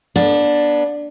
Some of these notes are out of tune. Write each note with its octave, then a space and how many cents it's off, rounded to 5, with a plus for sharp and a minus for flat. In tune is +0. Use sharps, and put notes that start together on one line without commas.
B3 -35 D4 +0